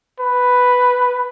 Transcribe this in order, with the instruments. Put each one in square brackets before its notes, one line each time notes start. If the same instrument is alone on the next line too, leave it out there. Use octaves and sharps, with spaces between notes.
[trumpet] B4